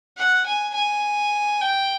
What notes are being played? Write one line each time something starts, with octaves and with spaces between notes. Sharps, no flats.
F#5
G#5
G#5
G5